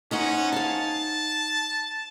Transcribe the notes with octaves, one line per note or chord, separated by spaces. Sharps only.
C#4 D#4 C5 F#5
F5 G#5 A5